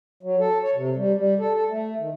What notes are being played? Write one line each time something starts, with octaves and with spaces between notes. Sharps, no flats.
F#3
A4
C#5
C3
G3
G3
A4
A4
A3
D#3